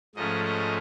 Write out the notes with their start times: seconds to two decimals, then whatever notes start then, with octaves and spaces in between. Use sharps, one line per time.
0.15 G#2 F3 A3 C#4 D#5
0.44 D#5